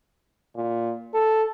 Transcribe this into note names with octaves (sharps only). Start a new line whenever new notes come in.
A#2
A4